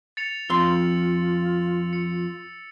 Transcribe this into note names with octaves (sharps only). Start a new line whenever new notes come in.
A6 C#7 F7
F2 F4 C6 E6 A6
C#7